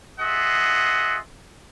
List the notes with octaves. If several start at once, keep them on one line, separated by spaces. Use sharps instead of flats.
F4 G#4 D#5 E5 F#5